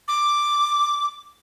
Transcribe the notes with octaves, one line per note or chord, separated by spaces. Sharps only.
D6